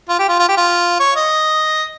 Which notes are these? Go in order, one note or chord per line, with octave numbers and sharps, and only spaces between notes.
F4
G4
F4
F4
G4
F4
C#5
D#5